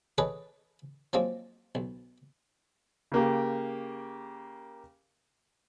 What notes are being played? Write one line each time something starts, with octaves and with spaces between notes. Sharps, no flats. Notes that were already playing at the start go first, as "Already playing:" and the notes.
G#4 A4 B4 C#5 D#5
F3 F#3 G#3 A#3 C4
B1
C#3 A#3 G4